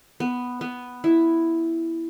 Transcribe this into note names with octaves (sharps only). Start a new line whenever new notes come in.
B3
B3
E4